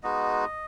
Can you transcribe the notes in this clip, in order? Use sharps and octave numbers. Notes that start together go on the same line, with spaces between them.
G#3 B3 D#4 F#4 D#5